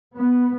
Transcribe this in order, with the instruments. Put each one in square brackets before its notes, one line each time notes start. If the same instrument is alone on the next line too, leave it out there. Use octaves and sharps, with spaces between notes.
[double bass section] B3